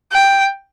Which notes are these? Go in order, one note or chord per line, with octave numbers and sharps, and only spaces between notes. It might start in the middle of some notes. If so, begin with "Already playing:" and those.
G5